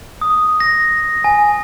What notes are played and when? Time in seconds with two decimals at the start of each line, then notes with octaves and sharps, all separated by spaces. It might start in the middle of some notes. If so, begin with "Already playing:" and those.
0.21 D#6
0.60 A#6
1.24 G#5